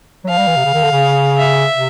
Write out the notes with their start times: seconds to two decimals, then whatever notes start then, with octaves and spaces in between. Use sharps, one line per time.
0.24 F#3
0.29 F3 F5
0.38 G3
0.47 E3
0.57 C3
0.65 C#3
0.74 D#3
0.83 D3
0.92 C#3
1.37 E5
1.74 C3